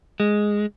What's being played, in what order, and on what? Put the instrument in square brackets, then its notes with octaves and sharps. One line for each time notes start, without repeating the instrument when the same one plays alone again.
[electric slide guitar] G#3